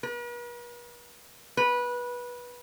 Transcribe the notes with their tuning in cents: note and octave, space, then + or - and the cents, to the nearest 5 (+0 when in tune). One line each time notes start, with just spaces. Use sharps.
B4 -45
B4 -20